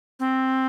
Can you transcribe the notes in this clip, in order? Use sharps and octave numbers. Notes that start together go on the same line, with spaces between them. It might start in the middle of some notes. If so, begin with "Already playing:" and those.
C4